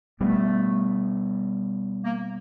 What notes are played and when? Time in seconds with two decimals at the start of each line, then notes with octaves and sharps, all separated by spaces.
0.20 B2 G3 A3 B3
2.05 A#3